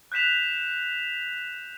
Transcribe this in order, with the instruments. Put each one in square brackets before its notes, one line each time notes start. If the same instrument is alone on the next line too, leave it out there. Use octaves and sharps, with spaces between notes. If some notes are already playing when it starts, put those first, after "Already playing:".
[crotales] F#6 G6 B6 E7 F7